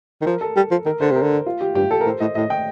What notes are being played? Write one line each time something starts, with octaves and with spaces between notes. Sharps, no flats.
D#3
F3 A#4
A4
G3
F3
D#3 A#4
D3 C5
C3 A#4
D3
F4
G4
G2 G4
A4
A#4
A2 C5
A2 D#5
A2 D#5
G5